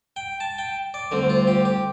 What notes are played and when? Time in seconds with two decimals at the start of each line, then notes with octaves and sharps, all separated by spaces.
0.16 G5
0.40 A5
0.58 G5
0.94 D5
1.11 D2 D3 G3 C4
1.30 F4
1.47 G4
1.65 G4